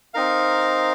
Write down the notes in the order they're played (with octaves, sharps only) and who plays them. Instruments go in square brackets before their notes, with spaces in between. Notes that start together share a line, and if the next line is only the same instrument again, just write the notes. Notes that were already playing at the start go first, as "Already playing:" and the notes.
[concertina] C4 D#4 A#4 F5